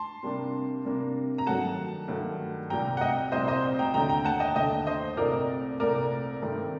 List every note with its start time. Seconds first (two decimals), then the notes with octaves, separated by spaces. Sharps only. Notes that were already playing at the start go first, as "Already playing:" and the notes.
Already playing: A5 C6
0.23 C3 G3 A#3 D4
0.85 C3 G3 A#3 D4
1.38 A#5
1.46 G2 D#3 F#3 A3 F#5 A5
2.08 G2 D#3 F#3 A3
2.70 C2 A#2 G3 C4 G5 A#5
2.97 F#5
3.01 D#5 G5
3.32 C2 A#2 G3 C4 C5 D#5
3.48 C5 D#5
3.79 G5 A#5
3.94 D#2 D3 A3 G5 A#5
4.09 G5 A#5
4.25 F#5 A5
4.40 D#5 G5
4.56 D#2 D3 A3 D#5 G5
4.87 C5 D#5
5.17 C2 A#2 A3 C4 A#4 D5
5.80 C2 A#2 A3 C4 A#4 D5
6.42 G2 D#3 A3 C4